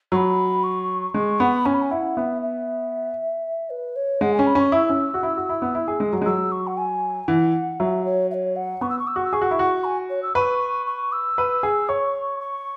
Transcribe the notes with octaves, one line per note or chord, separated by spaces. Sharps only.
F#3 B5 C#6
C#6
G#3 C#6
B3 B5
C#4 G#5
B5
G#5
E4 F#5
B3 E5
E5
B4
C#5
G#3 F#5
G#5
C#4
B5
C#4 C#6
E4 E6
C#4
F#4
E4
F#4
E4
B3
E4
G#4
G#3
F#3
G#3
F#3 E6
C#6
F#5
G#5
E3 F#5
F#3 E5
C#5
E5
C#5
F#5
B3 C#6
E6
C#6
E6
F#4 C#6
E6
G#4 C#6
F#4
E4
F#4
G#5
C#5
E6
B4 C#6
C#6
E6
B4
G#4
C#5 C#6
C#6